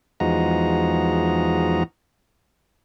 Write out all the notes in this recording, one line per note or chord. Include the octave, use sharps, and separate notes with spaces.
E2 F3 G#3 D#4 F#4 A#5